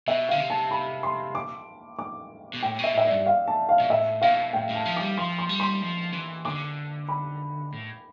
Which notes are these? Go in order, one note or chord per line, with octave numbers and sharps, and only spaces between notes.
B2 E5
D3 F5
C3
A5
B5
C6
D6
D6
B2
A2 G5
B2
E5
A2 E5
D5
G2
F5
A5
F5
B2
A2 E5
B2 F5
A2 G5
A2
A5
F3
G3 D6
F3 C6
C6
G3
C6
F3
E3
D3 D6
B5
A2